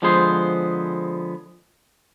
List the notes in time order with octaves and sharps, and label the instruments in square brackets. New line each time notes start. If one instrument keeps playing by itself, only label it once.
[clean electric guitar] D3 F3 G#3 B3 G#4 C5